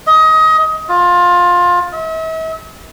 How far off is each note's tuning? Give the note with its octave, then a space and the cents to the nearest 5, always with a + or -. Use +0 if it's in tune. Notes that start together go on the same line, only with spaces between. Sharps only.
D#5 +25
F4 +20
E5 -40